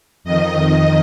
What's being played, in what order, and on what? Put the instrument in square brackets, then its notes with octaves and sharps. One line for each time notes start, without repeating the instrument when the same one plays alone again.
[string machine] F2 D#3 D#5